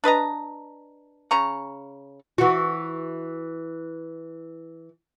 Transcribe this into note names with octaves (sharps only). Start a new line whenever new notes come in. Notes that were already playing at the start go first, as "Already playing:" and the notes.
D4 B4 D#5 A#5
C#3 A#5 C#6
E3 F#4